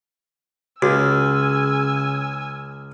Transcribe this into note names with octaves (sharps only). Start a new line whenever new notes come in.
C#2 C#3 F#4 G#5 E6